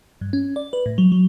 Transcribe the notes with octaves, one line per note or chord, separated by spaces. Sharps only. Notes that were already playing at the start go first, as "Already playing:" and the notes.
G2
C#4
D5
B4
A2
F#3
F#3